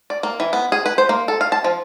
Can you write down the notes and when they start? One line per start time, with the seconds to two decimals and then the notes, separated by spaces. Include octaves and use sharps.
0.10 D5
0.23 A#3
0.40 E3
0.53 B3
0.72 G#4
0.86 B4
0.98 C5
1.09 A#3
1.28 A4
1.41 F5
1.52 A5
1.64 F3